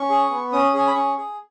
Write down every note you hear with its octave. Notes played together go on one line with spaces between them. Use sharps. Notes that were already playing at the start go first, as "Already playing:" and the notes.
Already playing: C#4 C#6
G#4
B3
C#4 D#6
G#4 G#5
B5
C#4 C#6
G#4